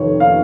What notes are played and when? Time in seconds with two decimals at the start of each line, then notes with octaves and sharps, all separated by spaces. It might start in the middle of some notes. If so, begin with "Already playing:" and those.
Already playing: F1 F2 D#3 C#5
0.20 F5